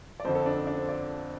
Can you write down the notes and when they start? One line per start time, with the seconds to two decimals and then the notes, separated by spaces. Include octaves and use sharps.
0.20 D5
0.25 F2 D3 F3 C5
0.35 A4
0.46 D4
0.57 C4
0.67 D4
0.77 C4
0.89 D5